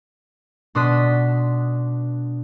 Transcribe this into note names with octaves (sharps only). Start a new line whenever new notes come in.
B2 D4 C6 D#6 F#6 B6